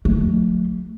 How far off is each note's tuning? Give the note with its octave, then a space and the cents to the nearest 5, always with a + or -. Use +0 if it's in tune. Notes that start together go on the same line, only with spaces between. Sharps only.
F3 +45 A3 +0